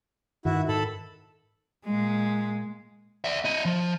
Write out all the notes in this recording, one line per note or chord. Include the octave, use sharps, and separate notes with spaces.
G2 D#3 E4 F#4
G#2 A4 A5 B5
A#2 G#3
D5 E5
E4 D#5
F3